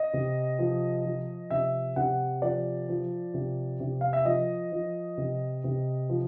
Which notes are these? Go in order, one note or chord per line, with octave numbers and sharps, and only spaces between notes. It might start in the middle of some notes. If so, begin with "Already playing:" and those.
Already playing: D#5
C3
F3
F3
C3 E5
C3 F#5
F3 D5
F3
C3
C3
F5
E5
F3 D#5
F3
C3
C3
F3